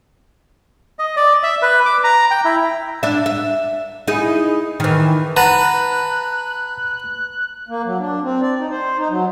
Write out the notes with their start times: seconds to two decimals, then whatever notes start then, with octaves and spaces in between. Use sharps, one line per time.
0.99 D#5
1.17 D5
1.43 E5
1.62 B4
1.86 D6
2.04 A#5
2.31 G5
2.45 E4
3.03 D4 E5
3.26 E5
4.07 D#4 E4 G#4
4.80 D#3 E3
5.37 B4 F#5 A5 A#5 F#6
7.68 A#3
7.85 F#3
7.99 D4
8.22 C4
8.41 D5
8.58 D#4
8.71 C5
8.97 D#4
9.09 F#3